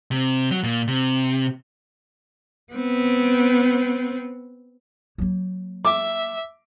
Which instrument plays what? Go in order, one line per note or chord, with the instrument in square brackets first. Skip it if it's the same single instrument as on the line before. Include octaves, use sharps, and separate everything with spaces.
[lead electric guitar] C3
F#3
A#2
C3
[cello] B3 C4
[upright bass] F#3 A#3
[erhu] E5 [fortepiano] D6